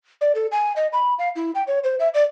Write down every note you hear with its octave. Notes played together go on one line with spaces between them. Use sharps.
D5
A4
G#5
D#5
B5
F5
E4
G5
C#5
C5
E5
D5